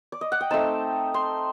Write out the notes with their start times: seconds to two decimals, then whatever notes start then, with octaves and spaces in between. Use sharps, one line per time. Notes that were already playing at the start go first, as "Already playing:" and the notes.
0.12 D5
0.21 D#5
0.32 F#5
0.41 G5
0.50 A3 C4 D#4 A5
1.14 C6